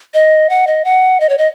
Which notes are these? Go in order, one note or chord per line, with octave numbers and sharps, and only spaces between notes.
D#5
F#5
D#5
F#5
D#5
C#5
D#5